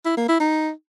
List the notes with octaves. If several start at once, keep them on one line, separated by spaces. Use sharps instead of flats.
E4
A#3
E4
D#4